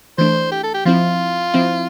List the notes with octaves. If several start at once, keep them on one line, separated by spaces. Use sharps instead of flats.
E3 A3 D4 C5
G4
A4
G4
F3 C4 E4 F4
F3 C4 E4